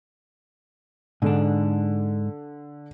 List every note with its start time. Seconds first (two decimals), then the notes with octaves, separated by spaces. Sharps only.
1.22 G#2 D3 D4